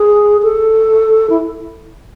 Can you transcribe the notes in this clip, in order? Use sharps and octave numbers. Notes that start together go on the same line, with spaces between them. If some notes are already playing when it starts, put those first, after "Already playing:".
Already playing: G#4
A4
E4